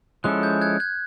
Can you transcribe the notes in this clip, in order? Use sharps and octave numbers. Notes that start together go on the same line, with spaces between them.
F3 G#3 C#4 E4 A4 F#6
G6
F#6 G#6
F#6 G#6